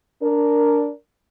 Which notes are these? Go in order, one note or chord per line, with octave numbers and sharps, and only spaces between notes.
D4 A#4